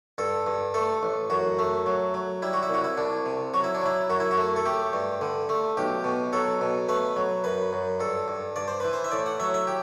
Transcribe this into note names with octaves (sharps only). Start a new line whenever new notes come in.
G2 A4
G2
A3 A4
A1
F#2 F#4
A3
F#3
F#3
G3 E4
F#4
E4
C2 F#4
E4
C2 D4
C3
F#3 F#4
E4
D4
F#3 E4
F#2 F#4
E4
F#4
A3
A4
A3 G4
G2
D3
A3
B1 G4
B2
F#3 A4
B2
A3 B4
F#3
F#2 B4
F#2
G2 A4
G2
G2 D5
C5
E3 B4
C5
E5
A2 D5
F#5
F#3 E5
E5
G4